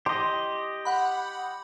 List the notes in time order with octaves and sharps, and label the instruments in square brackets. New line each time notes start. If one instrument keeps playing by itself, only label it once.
[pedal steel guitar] G4 D#5 [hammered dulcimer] C6
[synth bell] F#5 B5